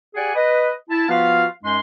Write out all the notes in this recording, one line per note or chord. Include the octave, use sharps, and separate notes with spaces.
G4 G#4 D5 F#5 G#5
B4 D#5
E4 A5
F3 B3 F4 F#4 B4 F5
F#2 G#3 C#4 D#4 C6